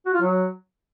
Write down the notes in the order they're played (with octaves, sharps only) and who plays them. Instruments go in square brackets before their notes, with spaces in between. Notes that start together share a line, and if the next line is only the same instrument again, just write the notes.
[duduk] F#4
F4
F#3